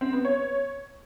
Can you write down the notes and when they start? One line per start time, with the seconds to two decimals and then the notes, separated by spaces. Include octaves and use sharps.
0.01 C4
0.13 B3
0.25 C#5